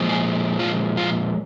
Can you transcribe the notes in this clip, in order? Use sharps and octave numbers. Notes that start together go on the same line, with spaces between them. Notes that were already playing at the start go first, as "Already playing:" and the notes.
Already playing: A#2 F3 G#3
G#4
F4
F4